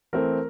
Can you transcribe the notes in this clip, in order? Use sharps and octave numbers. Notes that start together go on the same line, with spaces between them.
E3 A3 C4 A#4